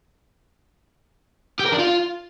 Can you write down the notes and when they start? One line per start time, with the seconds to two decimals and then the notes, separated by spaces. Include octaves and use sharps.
1.59 G4
1.66 A#4
1.72 D4
1.79 F4